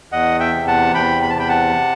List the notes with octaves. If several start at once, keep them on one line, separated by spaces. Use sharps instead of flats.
E2 D#5 F#5
E5 G5
C3
F#5 A5
E2 G5 B5
B5
A5
C3 G5 B5
F#5 A5